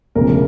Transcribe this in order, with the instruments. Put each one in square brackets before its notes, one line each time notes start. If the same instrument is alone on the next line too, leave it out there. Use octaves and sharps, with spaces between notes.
[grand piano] E1 D2 C#3 F3 A#4